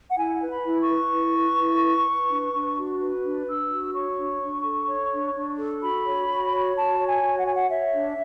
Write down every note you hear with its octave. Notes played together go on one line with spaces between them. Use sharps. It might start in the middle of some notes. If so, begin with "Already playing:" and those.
F#5
E4 G#5
B4
B5
E4
C#6
B4
E4
B4
E4
B4
B4
D4
D4
F#4
B4
D4
D4 E6
F#4
C#5 C#6
D4
D4
A4
C#5
D4
D4
A4
F#4 B5
C#5
F#4
C#5
F#4 A5
C#5
G#5
F#4
F#5
C#5 G#5
F#5
C#5 E5
D4